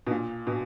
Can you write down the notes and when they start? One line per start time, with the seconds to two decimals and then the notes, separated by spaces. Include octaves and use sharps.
0.07 B2
0.11 A#2
0.47 B2